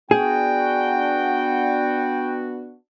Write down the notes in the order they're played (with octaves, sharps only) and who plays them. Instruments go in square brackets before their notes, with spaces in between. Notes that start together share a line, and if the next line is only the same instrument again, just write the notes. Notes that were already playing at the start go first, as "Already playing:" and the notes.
[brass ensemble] B3 D4 F#4 [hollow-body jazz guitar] G#4 [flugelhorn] G5